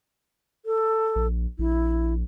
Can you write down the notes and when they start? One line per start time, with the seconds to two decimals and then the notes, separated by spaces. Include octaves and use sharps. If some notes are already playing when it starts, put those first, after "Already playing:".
0.66 A4
1.16 A#1
1.59 A#1 E4